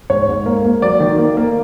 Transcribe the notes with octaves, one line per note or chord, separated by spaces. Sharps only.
G#2 C#5
G#2
A#3
A#3
F#3 D5
D#3
A#3
A#3